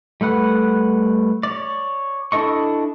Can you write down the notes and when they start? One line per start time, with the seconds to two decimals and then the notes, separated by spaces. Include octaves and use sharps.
0.21 G3 A3 B4 F#5
1.43 C#5 D5
2.32 D4 E4 A4 D#5 C#6